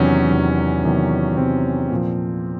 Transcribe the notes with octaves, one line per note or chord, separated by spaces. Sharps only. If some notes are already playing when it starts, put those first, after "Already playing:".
Already playing: E2 C3 D#3 F#3 C#4
E2 C3 D#3 F#3
E2 C3 D#3 F#3
E2 C3 D#3 F#3 C4
A#2 F3